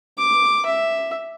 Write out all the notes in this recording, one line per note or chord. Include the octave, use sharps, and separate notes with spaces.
D6
E5